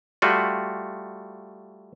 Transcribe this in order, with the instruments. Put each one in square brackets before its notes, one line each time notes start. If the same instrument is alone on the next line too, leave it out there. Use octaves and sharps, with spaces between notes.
[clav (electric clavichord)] G3 A3 F4 F#4